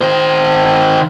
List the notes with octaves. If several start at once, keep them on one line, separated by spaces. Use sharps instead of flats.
D#3 C5